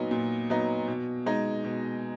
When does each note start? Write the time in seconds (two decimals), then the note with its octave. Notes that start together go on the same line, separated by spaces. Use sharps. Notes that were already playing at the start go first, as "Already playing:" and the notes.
Already playing: A#2 F#3 B3 D#4
0.11 A#2
0.50 F#3 B3 D#4
0.88 B2
1.26 G#3 D#4
1.64 B2